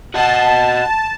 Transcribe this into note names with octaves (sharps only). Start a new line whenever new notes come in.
F#4 D#5 F#5 A5